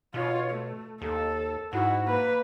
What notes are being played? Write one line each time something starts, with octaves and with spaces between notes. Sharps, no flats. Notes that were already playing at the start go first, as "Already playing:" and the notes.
B2 F4 C#5
A3
D#2 A4
G#2 E4 F#4
A#3 B4